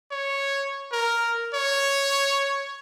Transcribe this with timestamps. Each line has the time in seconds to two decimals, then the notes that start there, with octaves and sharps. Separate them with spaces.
0.11 C#5
0.92 A#4
1.54 C#5